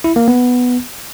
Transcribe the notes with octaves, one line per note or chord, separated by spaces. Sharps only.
E4
A#3
B3